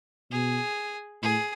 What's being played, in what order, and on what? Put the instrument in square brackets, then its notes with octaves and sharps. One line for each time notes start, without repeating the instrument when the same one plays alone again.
[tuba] B2 [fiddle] G#4
[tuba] A2 [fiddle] G#4